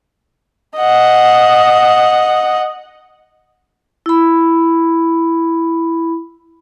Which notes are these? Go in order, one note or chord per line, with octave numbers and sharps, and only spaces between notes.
D#5 F#5
E4 B5